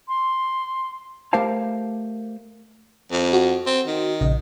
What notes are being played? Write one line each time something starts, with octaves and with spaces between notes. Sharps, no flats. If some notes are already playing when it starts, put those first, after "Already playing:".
C6
A3 G4 A#4 C5 F5 A5
F2
F#4
C4
D#3
A#1 C#3 D#5